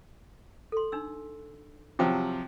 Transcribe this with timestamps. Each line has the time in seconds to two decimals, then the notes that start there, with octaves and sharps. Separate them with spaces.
0.72 A4 C6
0.92 D4 D#4 E6
1.99 C3 F3 F#3 G4 G5 D#6